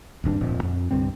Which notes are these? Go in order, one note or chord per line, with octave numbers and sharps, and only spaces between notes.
D#1 G#1 G2 D4
D1 G#1 F2 A#2
F2
C2 G2 D3 C4